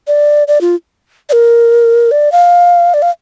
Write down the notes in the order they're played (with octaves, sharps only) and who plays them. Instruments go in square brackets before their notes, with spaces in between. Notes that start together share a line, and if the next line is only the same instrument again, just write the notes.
[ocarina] D5
D5
F4
D5
A#4
D5
F5
D5
F5